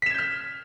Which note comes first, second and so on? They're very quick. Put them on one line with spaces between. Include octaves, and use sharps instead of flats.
B6 E7 G#6 G6 F6